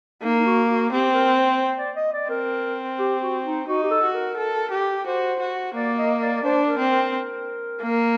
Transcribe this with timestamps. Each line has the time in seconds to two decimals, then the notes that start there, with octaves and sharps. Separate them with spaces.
0.23 A#3 D#4
0.39 D#4
0.45 F#4
0.69 F#4
0.92 C4 G4
1.14 A#4
1.38 C5
1.61 C5
1.78 D5
1.96 D#5
2.13 D5
2.29 C4 A#4
2.99 G4
3.22 F#4
3.45 D#4
3.68 D#4 F#4
3.83 G4
3.91 A4
4.03 F#4
4.14 A#4
4.37 A4
4.71 G4
5.06 F#4 C5
5.40 F#4
5.75 A#3 D5
5.98 D#5
6.22 D5
6.35 D5
6.44 D4 C5
6.67 A#4
6.79 C4
6.90 A#4
7.82 A#3